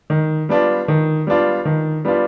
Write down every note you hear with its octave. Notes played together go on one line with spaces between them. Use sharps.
D#3
G3 B3 D4 F4
D#3
G3 B3 D4 F4
D#3
G3 B3 D4 F4